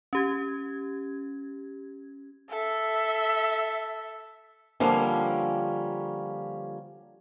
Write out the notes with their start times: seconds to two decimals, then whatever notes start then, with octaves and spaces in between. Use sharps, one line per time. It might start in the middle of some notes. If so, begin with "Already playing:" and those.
0.13 C#4 G4 G#6
2.49 A4 E5
4.80 D3 F3 G3 A#3 C#4